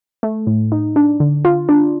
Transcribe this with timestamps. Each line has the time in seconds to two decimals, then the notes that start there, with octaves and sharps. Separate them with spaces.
0.23 A3
0.47 A2
0.72 D#4
0.96 D4
1.20 D3
1.45 F4
1.69 D4